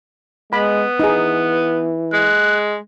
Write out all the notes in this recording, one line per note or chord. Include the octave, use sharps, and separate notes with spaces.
G#3 B3 B5
E3 D#4 G#4
G#3 F#6